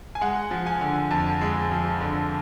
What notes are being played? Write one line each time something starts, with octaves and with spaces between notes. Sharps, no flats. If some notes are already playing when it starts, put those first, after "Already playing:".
G#5
G#3 F#5
F3
G#5
D3
F2 A5
G#3
F3
D3